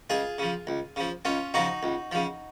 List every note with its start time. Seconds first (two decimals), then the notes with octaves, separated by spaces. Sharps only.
0.10 C#2 F4 G#4
0.38 C#3 F3
0.67 C#2
0.96 C#3 F3
1.25 C#2 C#4 F4
1.54 C#3 F3 D#4 F#4
1.83 C#2
2.12 C#3 F3